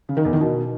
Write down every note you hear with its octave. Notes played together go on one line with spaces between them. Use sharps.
C#3
D#3
E2
D#3
B2